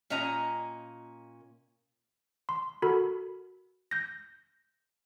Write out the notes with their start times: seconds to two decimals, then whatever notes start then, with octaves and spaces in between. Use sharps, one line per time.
0.10 A#2 C#4 D#5 A#5
2.49 C6
2.82 F#4 A4 A#4 B5
3.91 G6 A#6